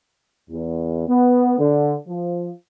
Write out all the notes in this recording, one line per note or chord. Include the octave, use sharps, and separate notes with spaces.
E2
B3
D3
F3